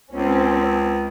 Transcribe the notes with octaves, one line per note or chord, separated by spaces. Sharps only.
C#2 C4 C#4